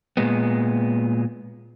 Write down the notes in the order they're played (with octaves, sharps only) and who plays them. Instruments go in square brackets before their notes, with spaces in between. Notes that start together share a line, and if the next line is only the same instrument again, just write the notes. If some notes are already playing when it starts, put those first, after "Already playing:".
[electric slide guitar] A#2 G#3 B3